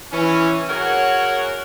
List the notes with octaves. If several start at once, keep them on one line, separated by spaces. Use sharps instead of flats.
E3 C#4
F#4 G#4 A#4 C#5 F#5